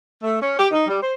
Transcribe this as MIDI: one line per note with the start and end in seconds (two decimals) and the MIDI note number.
0.23 0.36 57
0.40 0.54 61
0.57 0.67 67
0.70 0.86 63
0.86 1.00 55
1.01 1.13 72